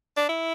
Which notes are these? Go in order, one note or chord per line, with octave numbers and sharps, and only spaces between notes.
D4
E4